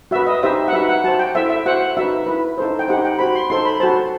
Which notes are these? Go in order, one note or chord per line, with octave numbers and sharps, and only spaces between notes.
F#4 B4 E5
D#5
D#4 G4 C5 E5
F#5
D#4 F#4 B4 E5
F#5
F#4 C5 A5
G5
E4 A4 C5 E5
E5
F#4 C5 F#5
D#4 F#4 B4 E5
E4 B4
D#4 A4 C5
G5
D#4 G4 C5 F#5
G5
F#4 C5 B5
C6
D#4 A4 C5 C6
B5
F#4 A4 C5 A5